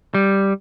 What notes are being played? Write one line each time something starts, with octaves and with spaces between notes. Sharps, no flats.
G3